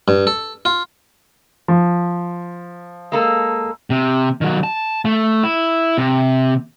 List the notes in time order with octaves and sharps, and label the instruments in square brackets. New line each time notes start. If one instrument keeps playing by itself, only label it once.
[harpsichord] G2
A4
F4
[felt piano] F3
[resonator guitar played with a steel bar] G#3 A#3 A4
[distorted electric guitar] C3
D#3 F#3
A5
A3
E4
C3